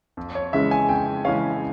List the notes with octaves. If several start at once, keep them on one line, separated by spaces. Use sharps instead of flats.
F2
C#5
C#3 E3 G#3 C#4 E5
G#5
F2 G5
C#3 E3 G#3 C#4 F5